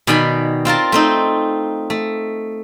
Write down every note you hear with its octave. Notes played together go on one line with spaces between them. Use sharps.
B2 D#3 D5 G#5 B5
C4 F4 A#4 A5
A3 C4 D#4
A3